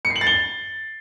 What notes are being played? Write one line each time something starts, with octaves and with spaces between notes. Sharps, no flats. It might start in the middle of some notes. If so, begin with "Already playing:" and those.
C#7
C7
F#7
A6
G7